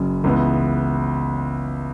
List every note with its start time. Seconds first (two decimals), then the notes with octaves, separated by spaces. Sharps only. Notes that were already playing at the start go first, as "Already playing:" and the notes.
Already playing: F#1 F#2 C#3
0.24 C#2 C#3 E3 B3